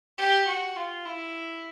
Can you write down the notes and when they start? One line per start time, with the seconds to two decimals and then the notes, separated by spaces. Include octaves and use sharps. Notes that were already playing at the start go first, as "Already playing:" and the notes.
0.19 G4
0.47 F#4
0.76 F4
1.05 E4